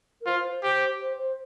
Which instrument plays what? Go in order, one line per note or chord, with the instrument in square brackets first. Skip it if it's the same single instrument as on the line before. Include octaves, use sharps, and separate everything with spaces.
[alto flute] A#4
[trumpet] F4 [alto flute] C5
[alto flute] C5
C5
[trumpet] G4 [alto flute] C5
[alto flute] C5
C5